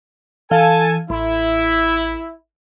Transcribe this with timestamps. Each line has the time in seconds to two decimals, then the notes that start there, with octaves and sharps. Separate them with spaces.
0.51 E3 A4 F5 G#5 A5
1.10 A1 E4